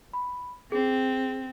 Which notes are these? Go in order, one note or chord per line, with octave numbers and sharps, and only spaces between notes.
B5
C4 G#4